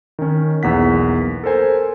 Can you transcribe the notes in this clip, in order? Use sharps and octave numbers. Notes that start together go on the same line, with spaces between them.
D#3 C#4
B1 E2 A#3 F#5 B6
A4 A#4 C5 G#5